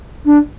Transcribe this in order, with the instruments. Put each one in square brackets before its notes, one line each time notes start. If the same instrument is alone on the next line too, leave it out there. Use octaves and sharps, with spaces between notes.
[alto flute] D4